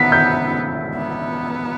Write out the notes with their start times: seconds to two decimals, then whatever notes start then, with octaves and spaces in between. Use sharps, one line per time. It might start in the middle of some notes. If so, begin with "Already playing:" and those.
Already playing: B3 B6
0.12 G6
0.95 B3